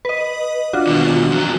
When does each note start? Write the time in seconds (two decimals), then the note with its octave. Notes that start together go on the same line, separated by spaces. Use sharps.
0.05 B4 D#5
0.73 D4 F4 F#4
0.87 D#2 B2
1.32 F2 F#3